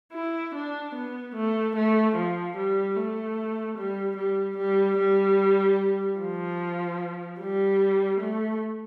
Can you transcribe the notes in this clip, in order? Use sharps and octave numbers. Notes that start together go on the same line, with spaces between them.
E4
D4
B3
A3
A3
F3
G3
A3
G3
G3
G3
G3
F3
G3
A3